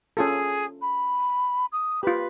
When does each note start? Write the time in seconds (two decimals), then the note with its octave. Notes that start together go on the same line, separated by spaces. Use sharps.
0.17 C#4 F4 G#4 A4
0.81 B5
1.72 D#6
2.03 F4 G4 B4